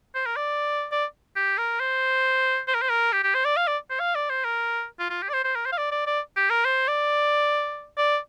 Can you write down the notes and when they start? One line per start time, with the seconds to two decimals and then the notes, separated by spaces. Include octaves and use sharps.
0.15 C5
0.26 A#4
0.36 D5
0.91 D5
1.36 G4
1.58 A#4
1.80 C5
2.67 C5
2.75 A#4
2.82 C5
2.90 A#4
3.13 G4
3.23 G4
3.35 C5
3.45 D5
3.56 F5
3.67 D5
3.90 C5
4.00 F5
4.15 D5
4.30 C5
4.45 A#4
5.00 F4
5.10 F4
5.22 G4
5.29 D5
5.33 C5
5.44 C5
5.55 A#4
5.66 C5
5.72 F5
5.78 D5
5.92 D5
6.07 D5
6.36 G4
6.50 A#4
6.65 C5
6.88 D5
7.97 D5